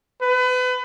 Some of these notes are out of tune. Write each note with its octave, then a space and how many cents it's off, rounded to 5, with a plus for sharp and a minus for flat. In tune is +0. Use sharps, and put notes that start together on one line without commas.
B4 +30